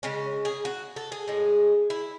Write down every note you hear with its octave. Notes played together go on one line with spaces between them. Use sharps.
C#3 G#3 C#4
G#4
F#4
A4
G#4
A2 G#3
E4